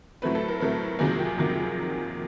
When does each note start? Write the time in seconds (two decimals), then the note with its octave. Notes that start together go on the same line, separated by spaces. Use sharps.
0.22 A2 F#3 A3 C4 B4
0.35 A4
0.48 A#4
0.60 A2 F#3 A3 C4 A#4
0.99 F2 C3 D#3 F#3 A#3 G#4
1.19 G4
1.38 F2 C3 D#3 F#3 A#3